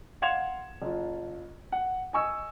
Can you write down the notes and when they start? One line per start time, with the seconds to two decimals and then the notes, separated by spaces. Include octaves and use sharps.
0.22 F5 F#5 C6 G#6 E7 F7
0.82 F#1 F4
1.72 F#5
2.13 D#5 G#5 C#6 E6